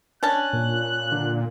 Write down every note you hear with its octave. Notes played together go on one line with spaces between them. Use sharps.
C#4 D4 A5 F#6
A#2
D3 D4